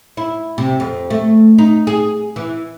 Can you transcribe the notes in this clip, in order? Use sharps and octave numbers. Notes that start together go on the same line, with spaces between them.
E4
C3
F2
A3
D#4
G#4
E3